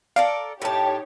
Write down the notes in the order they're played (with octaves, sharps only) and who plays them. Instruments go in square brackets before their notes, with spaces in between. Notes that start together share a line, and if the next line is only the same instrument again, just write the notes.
[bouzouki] A4 A#4 D5 [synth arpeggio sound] F5
[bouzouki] A2 A5 [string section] D#4 G4 C#5